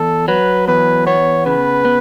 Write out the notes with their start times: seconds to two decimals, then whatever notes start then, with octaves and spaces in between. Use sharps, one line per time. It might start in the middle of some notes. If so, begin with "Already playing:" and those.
Already playing: E2 A4
0.28 F#3 B4
0.68 E2 B4
1.07 B3 C#5
1.46 C#3 B4
1.85 B3